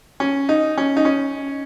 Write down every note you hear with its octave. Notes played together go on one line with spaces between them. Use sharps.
C#4
D#4
C#4
D#4
C#4